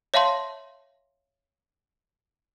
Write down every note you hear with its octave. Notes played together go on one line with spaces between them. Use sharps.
C#5 E5 F5 A5 C6